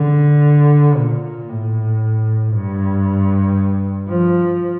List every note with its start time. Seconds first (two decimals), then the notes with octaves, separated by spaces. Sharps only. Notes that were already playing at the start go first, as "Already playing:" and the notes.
Already playing: D3
0.97 A#2
1.49 A2
2.54 G2
4.09 F3